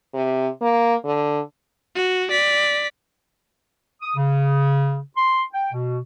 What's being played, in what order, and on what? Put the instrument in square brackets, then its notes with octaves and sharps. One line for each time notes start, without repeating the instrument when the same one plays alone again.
[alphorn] C3
A#3
D3
[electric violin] F#4
D5 B6
[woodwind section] D#6
C#3
C6
G5
B2